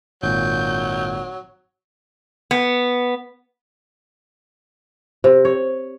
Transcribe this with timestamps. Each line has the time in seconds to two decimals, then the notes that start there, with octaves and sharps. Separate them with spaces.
0.23 G#1 A#2 F#3 G6
2.51 B3
5.24 C3
5.45 C#5